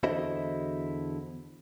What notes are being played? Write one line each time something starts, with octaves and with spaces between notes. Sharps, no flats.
E2 D3 E4 F#4 C5 D#5